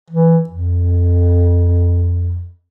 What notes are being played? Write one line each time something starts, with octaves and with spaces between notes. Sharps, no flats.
E3
F2